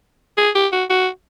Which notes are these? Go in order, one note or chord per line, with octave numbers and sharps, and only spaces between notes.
G#4
G4
F#4
F#4